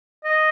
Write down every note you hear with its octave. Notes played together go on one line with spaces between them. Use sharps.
D#5